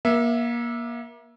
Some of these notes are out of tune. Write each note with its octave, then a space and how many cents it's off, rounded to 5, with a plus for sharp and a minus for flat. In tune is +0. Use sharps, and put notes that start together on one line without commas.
A#3 +30 E5 +0